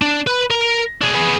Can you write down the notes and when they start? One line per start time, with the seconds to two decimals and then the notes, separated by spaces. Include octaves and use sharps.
0.02 D4
0.27 B4 B5
0.51 A#4
1.02 D4 G#4
1.14 B3 G#4